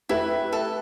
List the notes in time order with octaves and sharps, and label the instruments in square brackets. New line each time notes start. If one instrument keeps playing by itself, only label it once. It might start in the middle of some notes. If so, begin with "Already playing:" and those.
[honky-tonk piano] A3 G4 B4 E5 [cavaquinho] E4
[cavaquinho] A4